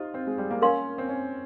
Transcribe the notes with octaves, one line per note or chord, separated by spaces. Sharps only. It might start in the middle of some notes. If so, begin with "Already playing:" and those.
Already playing: D#4 F4 G4 C5
C4
G#3
G3
A#3
C#4 A#4 F5 C6
C4
C#4